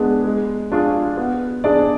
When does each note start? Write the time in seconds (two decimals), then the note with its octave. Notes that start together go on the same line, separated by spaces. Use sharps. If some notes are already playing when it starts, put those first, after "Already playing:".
Already playing: G#3 B3 D4 G#4
0.24 G#3
0.72 D4 F4 G#4
1.17 B3
1.64 D4 G#4 D5